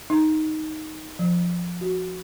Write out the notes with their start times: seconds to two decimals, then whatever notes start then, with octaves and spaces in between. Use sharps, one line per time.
0.10 D#4
1.19 F3
1.81 F#4